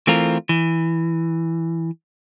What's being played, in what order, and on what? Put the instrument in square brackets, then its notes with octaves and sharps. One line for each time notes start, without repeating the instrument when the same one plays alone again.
[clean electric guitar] E3 A3 C4 F4 A#4
E3